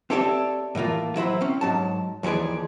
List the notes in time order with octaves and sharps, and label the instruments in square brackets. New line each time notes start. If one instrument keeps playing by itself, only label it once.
[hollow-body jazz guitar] C4 G4 A4 C#5 D5 E5
A2 E3 A#3 F4
F#3 E4 C5 B5
C4 C#4
G#2 F#3 A5
D#2 E3 F3 G#4 D5